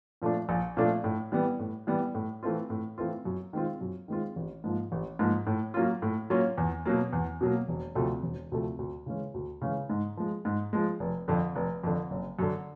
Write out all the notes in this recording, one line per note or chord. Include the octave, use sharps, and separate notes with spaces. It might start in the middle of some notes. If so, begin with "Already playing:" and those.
A#2 F3 A3 D4
A#1
A#2 F3 A3 D4
A2
E3 G3 B3
A2
E3 G3 B3
A2
E3 A3 C4 F4
A2
E3 A3 C4 F4
F#2
D#3 G#3 C4 F4
F#2
D#3 G#3 C4 F4
A1
G#2 F3 A#3
A1
G#2 F3 A#3
A2
F#3 A#3 C#4 F4
A2
F#3 A#3 C#4 F4
E2
B2 F#3 A#3
E2
B2 F#3 A#3
E1
D2 C3 F3 A3
E1
D2 C3 F3 A3
D2
C#3 E3 G#3 C#4
D2
C#3 E3 G#3 C#4
G#2
F3 G#3
G#2
F3 G#3
F1
F2 D3
F1
F2 D3
F#1
F#2 D3